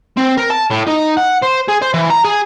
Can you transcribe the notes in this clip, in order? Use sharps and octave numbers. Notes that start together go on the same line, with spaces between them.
C4
A#4
A5
A2
D#4
F#5
C5
G#4
C5
E3
A#5
G#4